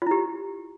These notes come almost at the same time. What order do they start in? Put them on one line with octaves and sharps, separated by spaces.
F4 E4 G4